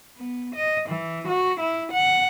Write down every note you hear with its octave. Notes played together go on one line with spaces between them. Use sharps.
B3
D#5
E3
F#4
E4
F#5